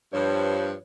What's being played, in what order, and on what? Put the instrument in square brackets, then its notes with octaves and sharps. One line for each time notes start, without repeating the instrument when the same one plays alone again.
[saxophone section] G2 F3 [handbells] B4 C#5